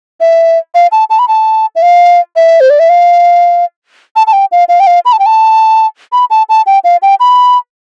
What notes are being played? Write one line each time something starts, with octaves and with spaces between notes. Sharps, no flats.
E5
F5
A5
A5
B5
A5
E5
F5
E5
C5
D5
E5
F5
A5
A5
G5
F5
F5
G5
F5
B5
A5
G5
A5
B5
A5
A5
G5
F5
G5
B5